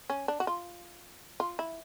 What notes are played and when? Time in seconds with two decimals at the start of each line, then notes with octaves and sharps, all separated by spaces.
0.10 C#4
0.28 D4
0.40 F#4
0.47 F4
1.40 F4
1.59 E4